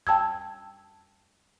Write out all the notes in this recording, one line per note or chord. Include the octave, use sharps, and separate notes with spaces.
G5 A5 E6 G#6